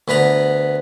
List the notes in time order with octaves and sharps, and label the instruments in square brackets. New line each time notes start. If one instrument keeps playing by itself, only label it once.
[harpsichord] D2 B3 B4 A#5 B5